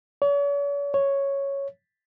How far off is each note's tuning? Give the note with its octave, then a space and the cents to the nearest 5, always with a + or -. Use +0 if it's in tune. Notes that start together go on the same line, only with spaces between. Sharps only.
C#5 +45
C#5 +0